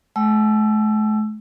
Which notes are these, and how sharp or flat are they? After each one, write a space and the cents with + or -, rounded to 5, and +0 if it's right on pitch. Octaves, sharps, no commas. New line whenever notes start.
A3 -45 G5 -30 E6 +20